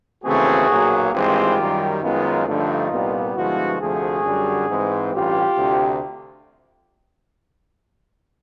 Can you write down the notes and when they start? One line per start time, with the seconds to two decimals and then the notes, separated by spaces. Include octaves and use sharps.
0.23 D#2 C#3 E3 A3 C4 F#4 G#4
0.68 B1 A#2 F#3 A#3
1.12 G#1 G2 E3 G#3 C4 F4 G4
1.57 F#2 D#3 G3
2.01 F#2 D#3 G#3 B3 D#4 F4
2.46 G2 D3 F3 A3 D#4 F4
2.91 C2 A#2 G3 B3
3.35 G2 D3 F3 G#3 B3 E4 F#4
3.79 D2 C3 F3 A3 F#4 G#4
4.24 F#2 D3 G3
4.68 G#2 E3 G#3 C4
5.13 A1 G2 E3 G3 F4 G4
5.57 D2 C3